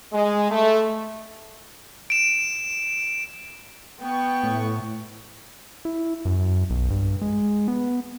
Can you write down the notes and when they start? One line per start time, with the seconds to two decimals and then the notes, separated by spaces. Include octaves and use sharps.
0.13 G#3
0.50 A3
2.10 D7 E7
4.01 B3 G5 C#6
4.44 A2
5.85 E4
6.25 F#2
6.70 B1
6.90 G2
7.22 G#3
7.68 B3